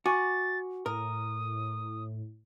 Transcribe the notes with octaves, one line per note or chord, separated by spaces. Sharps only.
F#4 G#5 C#6 D6 A6
A2 A#4 D#6